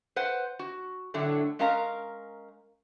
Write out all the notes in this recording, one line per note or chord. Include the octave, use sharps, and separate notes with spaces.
B4 C5 F#5
F#4
A2 D3 F#3 A3
G#3 C#4 A#4 F5 A#5